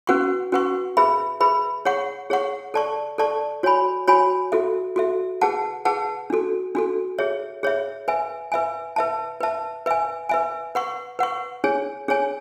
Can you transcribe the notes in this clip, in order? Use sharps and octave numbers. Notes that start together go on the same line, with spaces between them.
C#4 F#4 B4 F#5 C#6
C#4 F#4 B4 F#5 C#6
G#4 B4 E5 B5
G#4 B4 E5 B5
G#4 C#5 F#5 C#6
G#4 C#5 F#5 C#6
A4 D5 A5 C#6
A4 D5 A5 C#6
F#4 C#5 G#5 B5
F#4 C#5 G#5 B5
F#4 A4 E5
F#4 A4 E5
G#4 B4 F#5 A5
G#4 B4 F#5 A5
D4 F#4 A4
D4 F#4 A4
G#4 C#5 E5
G#4 C#5 E5
B4 E5 G#5
B4 E5 G#5
B4 E5 A5
B4 E5 A5
B4 E5 G#5
B4 E5 G#5
B4 F#5 C#6
B4 F#5 C#6
D4 G#4 C#5 G#5
D4 G#4 C#5 G#5